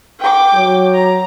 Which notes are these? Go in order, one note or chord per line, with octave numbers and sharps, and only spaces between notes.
G5 D6
F#3
A#5